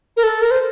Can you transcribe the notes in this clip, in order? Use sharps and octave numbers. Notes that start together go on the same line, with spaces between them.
A#4
A4
A#4
C5